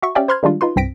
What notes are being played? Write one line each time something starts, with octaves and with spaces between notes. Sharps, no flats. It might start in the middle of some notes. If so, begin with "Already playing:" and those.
F#4 E5 C#6
C#4 G4 D5 E5 F5 G5
C5 B5 C6 F6 F#6 G#6
D#3 G3 G#3 D4 F4
D#4 F4 B4 C6
C2 G2 C4 A#6 B6 D7